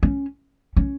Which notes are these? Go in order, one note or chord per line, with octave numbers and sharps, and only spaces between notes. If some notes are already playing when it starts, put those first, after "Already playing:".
C#4
C#4